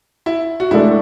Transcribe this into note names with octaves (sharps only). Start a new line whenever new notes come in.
E4
F#4
A2 G#3 D4 E4 A4